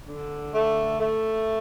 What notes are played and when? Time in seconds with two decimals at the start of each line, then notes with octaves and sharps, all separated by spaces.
0.08 D3
0.55 A3
1.00 A3